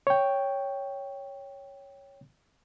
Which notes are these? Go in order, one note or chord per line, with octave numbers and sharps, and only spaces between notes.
C#5 G5